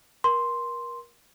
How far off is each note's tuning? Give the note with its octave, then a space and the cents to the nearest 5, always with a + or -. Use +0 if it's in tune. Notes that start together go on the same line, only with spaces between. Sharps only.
A#4 +30 C6 +0